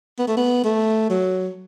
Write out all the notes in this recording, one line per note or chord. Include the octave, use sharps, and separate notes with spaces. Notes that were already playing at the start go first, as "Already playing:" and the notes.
B3
A3
B3
A3
F#3